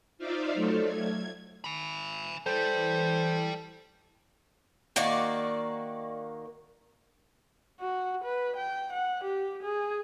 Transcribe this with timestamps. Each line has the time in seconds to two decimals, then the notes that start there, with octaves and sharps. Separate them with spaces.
0.18 D#4 F4 C5 D5 E5 F5
0.54 F#3 A3 A4
0.86 G#6
1.64 G#5 B5
2.46 E3 G3 A4 C5
4.96 D#3 A#3 F#4 D5
7.80 F#4
8.24 B4
8.57 G5
8.93 F#5
9.24 G4
9.63 G#4